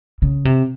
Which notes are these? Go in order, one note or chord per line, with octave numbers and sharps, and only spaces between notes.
C#3
C3